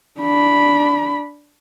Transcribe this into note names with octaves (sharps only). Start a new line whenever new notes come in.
D4 B5